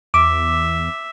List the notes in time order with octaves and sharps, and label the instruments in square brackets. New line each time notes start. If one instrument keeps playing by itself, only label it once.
[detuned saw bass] E2 [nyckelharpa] E5 [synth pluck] D6